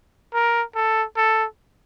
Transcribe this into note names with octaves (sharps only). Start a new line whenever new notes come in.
A#4
A4
A4